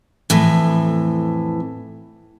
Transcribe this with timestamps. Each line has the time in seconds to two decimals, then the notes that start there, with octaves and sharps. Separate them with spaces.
0.30 F2 A2 E3